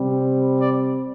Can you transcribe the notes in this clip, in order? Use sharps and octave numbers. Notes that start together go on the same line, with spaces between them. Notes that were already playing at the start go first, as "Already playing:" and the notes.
Already playing: C3 G3 C4
D5